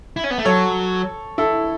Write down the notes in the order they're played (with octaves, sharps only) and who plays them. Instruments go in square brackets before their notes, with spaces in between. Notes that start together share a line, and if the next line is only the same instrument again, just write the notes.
[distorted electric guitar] E4
C#4
B3
A3
[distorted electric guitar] F#3 [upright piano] A4 C#5
[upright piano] E4 A4